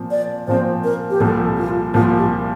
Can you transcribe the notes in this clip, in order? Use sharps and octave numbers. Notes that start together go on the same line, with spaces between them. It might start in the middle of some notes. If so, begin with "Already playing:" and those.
Already playing: A#2 F3 C4
D5
A#2 F3 C4 C5
A#4
G4
C2 A#2 F3 A4
F4
C2 A#2 F3 F4
G4